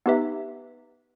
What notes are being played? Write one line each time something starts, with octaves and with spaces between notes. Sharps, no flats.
B3 D#4 G4 B4 E5